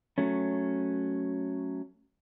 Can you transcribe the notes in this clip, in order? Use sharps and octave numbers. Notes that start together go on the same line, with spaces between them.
F#3 A3 C#4